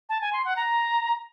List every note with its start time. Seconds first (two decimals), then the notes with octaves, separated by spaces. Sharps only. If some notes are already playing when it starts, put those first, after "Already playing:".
0.09 A5
0.21 G#5
0.33 C6
0.45 F#5
0.56 A#5